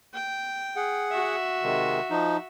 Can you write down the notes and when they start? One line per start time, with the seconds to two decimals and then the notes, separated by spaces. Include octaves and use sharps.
0.14 G5
0.76 G#4 F#5
1.11 F#4 E5
1.63 C3 D#3 G#3
2.10 F3 D#4